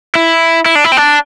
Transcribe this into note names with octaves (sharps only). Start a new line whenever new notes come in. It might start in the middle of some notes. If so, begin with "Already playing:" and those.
E4
E4
D4
E4
C4
D4